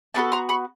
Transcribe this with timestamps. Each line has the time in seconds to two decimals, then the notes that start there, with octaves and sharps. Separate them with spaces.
0.14 B3 D4 F#4 A4 A5 B5
0.32 A#5 C6
0.49 B5 C#6